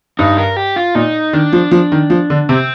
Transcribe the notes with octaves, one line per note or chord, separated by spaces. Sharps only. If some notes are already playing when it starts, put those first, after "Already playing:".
G2 D#4
A#4
G4
F4
A#2 D#4
D#3 D4
F3
F3
D#3
F3
D3
C3 C4